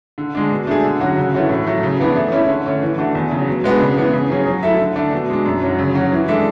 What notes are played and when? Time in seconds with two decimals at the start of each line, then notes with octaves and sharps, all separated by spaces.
0.18 D3
0.35 G#3 D4
0.51 B2
0.67 A3 D4 G#4
0.84 D3
1.00 F#3 C#4 F#4
1.17 C#3
1.34 E3 A3 C#4 F#4
1.49 A2
1.67 F#3 A3
1.83 C#3
2.00 E3 B3 D4
2.16 A3
2.32 C#4 E4
2.49 D3
2.66 A3 C#4
2.82 E3
2.98 A3 D4 F#4
3.15 E2
3.31 C#3 F#3
3.48 B2
3.64 G#3 B3 D4
3.80 C#3
3.98 E3 B3
4.13 C#3
4.30 F#3 C#4 G#4
4.47 F#3
4.63 A3 E4 A4 E5
4.80 D3
4.96 A3 D4
5.13 B2
5.30 G#3 D4
5.46 F#2
5.62 D3 F#3 C#4
5.79 C#3
5.94 F#3 C#4 F#4
6.12 E3
6.28 G#3 D4 A4 E5